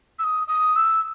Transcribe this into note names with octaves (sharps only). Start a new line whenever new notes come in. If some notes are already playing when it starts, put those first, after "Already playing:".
E6
D#6
D#6
E6